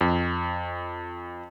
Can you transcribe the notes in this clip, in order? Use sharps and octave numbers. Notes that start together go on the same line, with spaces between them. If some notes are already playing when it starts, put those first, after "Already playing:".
F2